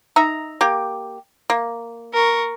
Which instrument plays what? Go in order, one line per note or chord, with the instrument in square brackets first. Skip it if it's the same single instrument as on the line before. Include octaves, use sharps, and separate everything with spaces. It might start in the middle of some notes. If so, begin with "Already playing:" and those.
[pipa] D#4 E5 A#5
A#3 G4
A#3
[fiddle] A#4 C#6